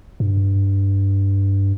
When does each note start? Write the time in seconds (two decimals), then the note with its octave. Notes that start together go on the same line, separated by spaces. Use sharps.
0.20 G2